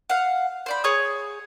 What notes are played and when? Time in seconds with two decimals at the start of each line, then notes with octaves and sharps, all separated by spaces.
0.10 F5 F#5
0.66 C5 D5 B5
0.84 G#4 C#5 D#6